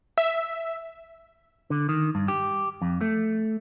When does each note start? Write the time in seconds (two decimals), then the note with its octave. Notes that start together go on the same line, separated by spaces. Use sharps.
0.18 E5
1.70 D3
1.89 D#3
2.15 G2
2.28 G4
2.82 F2
3.01 A3